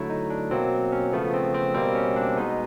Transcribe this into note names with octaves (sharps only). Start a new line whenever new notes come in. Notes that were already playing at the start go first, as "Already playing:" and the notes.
Already playing: D3 F#3 A3 E4
D#4
D4
B2 F#3 A#3 C4
C#4
C#3 F3 A3 B3
C4
C4
B2 G3 A#3 C4
C#4
D4
B2 G#3 B3 D#4